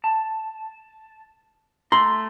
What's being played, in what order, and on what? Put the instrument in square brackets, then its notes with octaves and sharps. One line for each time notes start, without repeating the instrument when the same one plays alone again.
[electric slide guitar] A5
[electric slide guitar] A3 [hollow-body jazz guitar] A#5 C6